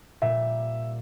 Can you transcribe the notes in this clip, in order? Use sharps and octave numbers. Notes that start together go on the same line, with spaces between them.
A#2 G3 E5